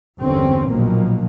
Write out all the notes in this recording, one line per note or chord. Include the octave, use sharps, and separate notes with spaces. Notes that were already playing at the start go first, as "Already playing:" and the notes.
G1 E2 D3 C4 C#4
A#1 B2 D#3 F3 F#3 A#3